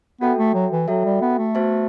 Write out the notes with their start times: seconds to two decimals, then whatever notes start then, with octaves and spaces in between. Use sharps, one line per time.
0.21 B3 F#4 A4 E5 G5
0.38 A3
0.54 F#3
0.72 E3
0.88 F#3 F#4 A4 E5 G5
1.05 G3
1.21 B3
1.38 A3
1.55 B3 F#4 C5 E5 A5